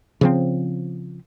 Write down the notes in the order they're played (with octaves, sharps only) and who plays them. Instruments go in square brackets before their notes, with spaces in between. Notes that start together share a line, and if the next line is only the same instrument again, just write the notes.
[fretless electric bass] C#3 F3 C4